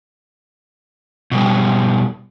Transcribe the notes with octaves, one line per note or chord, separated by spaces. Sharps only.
B2 F#3 G3